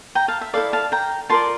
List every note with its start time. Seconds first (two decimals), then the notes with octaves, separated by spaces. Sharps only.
0.15 G5 A#5
0.28 F5 A5
0.41 E5
0.54 E4 A4 D5 F5
0.73 F5 A5
0.92 G5 A#5
1.30 F4 A#4 D5 A5 C6